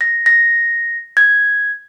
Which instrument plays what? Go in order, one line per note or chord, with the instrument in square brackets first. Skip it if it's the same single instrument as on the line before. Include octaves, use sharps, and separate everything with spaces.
[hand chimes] A#6
A#6
G#6